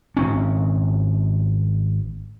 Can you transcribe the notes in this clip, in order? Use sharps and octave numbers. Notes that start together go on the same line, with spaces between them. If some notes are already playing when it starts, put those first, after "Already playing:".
G#1 C4 C#4